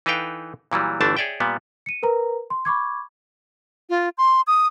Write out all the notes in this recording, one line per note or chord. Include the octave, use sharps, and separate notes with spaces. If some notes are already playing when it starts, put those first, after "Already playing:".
E3 D#4 A4 B4 F5 G5
A#2 E3 F#3 G3
G1 D3 E3 A3 D4 A5
G#4 C#5 D5 E5 G5
A#2 G3 B3
C#7 D#7
A#4 B4 A#5
C6
B5 C#6 D6 G#6
F4
C6
D#6